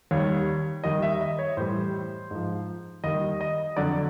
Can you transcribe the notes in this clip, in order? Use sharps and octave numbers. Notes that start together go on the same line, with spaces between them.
D#2 D#3 G3 C#5
D#2 D#3 G3 D#5
E5
D#5
C#5
A2 E3 G3 C5
G#2 F3
D#2 D#3 G3 D#5
D#5
F2 D3 F#3 D5